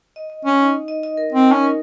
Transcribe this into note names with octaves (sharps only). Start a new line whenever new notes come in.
D#5
D#5
C#4 D#5
D#4
D#5
D#5
D#5
A#4
C4 D#5
C#4 D#4
A#4